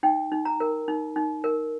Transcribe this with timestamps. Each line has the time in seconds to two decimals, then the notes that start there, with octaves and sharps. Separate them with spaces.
0.03 D#4 G5
0.32 D#4
0.45 A#5
0.60 A#4
0.88 D#4
1.16 D#4
1.44 A#4